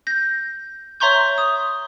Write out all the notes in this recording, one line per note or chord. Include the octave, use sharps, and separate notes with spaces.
G6 A#6
C#5 E5 A#5 C6 C#6 G6
D#6